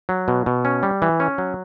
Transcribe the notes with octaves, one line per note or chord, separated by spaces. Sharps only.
F#3
B2
B2
C#4
G3
E3
C#4
F#3